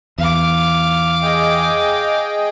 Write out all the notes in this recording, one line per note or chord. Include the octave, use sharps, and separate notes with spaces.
E2 F5 D6
G#4 D#5 G5